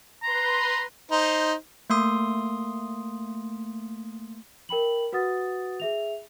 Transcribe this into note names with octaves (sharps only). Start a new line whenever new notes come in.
B4 A#5 C6
D#4 C5
A3 A#3 C6 D#6
A#4 G5 B5 F#7
F#4 B4 F#5 D#6 A6
G#4 E5 F7